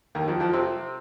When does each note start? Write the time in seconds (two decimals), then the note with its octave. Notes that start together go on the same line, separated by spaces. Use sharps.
0.15 D#2 D#3
0.28 F2 F3
0.40 F2 F3
0.53 C3 C4